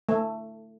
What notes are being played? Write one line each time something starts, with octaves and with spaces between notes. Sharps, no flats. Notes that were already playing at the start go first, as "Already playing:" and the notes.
A3